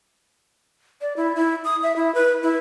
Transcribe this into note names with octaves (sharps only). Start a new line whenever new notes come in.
D5
E4
E4
D#6
E5
E4
B4
E4